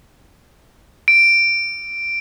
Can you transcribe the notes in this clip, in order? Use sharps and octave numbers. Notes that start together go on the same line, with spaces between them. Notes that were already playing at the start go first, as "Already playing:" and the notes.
D7